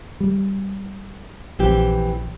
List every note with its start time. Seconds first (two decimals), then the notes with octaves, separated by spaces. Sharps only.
0.20 G3
1.59 A#1 E3 C4 G4